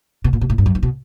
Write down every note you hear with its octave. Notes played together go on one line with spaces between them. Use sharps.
B2
A#2
B2
A2
G2
F#2
G2
B2